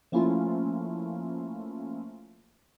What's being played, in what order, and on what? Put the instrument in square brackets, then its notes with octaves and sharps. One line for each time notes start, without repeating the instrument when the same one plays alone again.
[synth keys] F3 A3 A#3 C#4 E4 F4